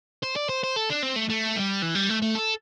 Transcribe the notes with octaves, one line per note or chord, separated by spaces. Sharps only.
C5
D5
C5
C5
A4
D4
C4
A3
A3
G3
E3
G3
A3
A3
A4